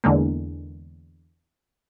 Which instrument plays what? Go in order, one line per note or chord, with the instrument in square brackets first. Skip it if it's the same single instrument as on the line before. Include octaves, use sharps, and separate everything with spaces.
[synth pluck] E2 D3 G#3 A#3